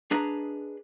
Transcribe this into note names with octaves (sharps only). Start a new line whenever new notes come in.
D4 G#4 B4 D#5 A#5